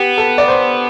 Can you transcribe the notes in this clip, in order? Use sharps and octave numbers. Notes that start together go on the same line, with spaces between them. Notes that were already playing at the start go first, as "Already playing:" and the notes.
Already playing: B3 G4
A4
D5
C5